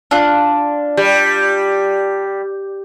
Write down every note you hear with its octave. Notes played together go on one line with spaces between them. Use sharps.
D4 F4 F#6
G3